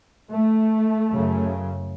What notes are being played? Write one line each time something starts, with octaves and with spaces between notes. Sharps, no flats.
A3
F#2 C#3